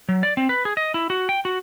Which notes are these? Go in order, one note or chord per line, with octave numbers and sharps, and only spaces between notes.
F#3
D5
C4
B4
G#4
D#5
E4
F#4
G5
F#4